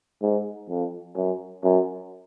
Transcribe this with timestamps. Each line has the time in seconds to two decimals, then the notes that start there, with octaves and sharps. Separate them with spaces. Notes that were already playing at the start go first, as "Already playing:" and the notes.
0.22 G#2
0.69 F2
1.16 F#2
1.64 F#2